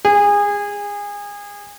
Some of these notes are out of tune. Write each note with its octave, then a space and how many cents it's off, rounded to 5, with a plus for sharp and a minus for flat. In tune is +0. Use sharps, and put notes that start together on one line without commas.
G#4 -25